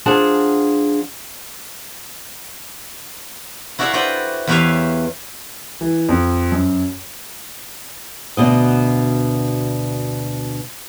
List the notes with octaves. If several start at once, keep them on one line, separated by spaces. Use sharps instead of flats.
F3 D4 G#4 F#5 A5
E4 F#4 A4 D5 E5 F5
F#4 B4 C5 D5 G5
E2 G4 B4 C#5 E5 F5
E3
F2
F#2
D2 B2 D#5